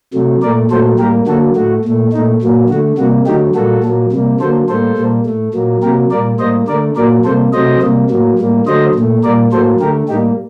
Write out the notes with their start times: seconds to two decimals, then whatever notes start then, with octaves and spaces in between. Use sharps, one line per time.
0.14 C3 F#3 A3
0.42 A#2 A3 A#4 D5
0.71 A#2 F#3 A3 A4 C5
0.99 A2 G3 A#3 G4 A#4
1.27 D3 F#3 A#3 F#4 A4
1.55 A2 A3 F#4
1.85 A#2 A3
2.13 A#2 D#4
2.17 A3
2.42 A#2 F#3 A#3
2.70 D3 F#4
2.74 A3
2.98 C3 G3 A#3 F#4
3.26 D3 F#3 A3 D#4 G4
3.55 A#2 G3 A#3 F#4 A4
3.84 A#2 F#3 A#3
4.12 C3 G3 A#3
4.40 D3 F#3 A#3 A4 C5
4.69 A2 G3 A#3 A4 C5
4.97 A#2 G3 A#3
5.26 A2 A3
5.54 A#2 F#3 A#3
5.82 C3 F#3 A#3 G4 A#4
6.11 A#2 G3 A#3 A#4 D5
6.39 A2 G3 A#3 C5 D#5
6.68 D3 A#4 D5
6.72 A3
6.96 A#2 F#3 A#3 A#4 D5
7.24 C3 G3 A#3 A4 C5
7.53 C3 F#3 A3 C5 D#5
7.81 C3 G3 A#3
8.10 A2 F#3 A#3
8.39 A2 G3 A#3
8.67 D3 F#3 A3 C5 D#5
8.95 A#2 A3
9.24 A#2 G3 A#3 A#4 D5
9.53 A2 F#3 A#3 A4 C5
9.80 D3 A3 G4 A#4
10.09 A2 G3 A#3 D#4 G4